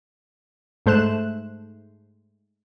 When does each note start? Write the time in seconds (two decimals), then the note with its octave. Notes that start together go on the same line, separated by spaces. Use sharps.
0.86 G#2 A3 C5 F#6 E7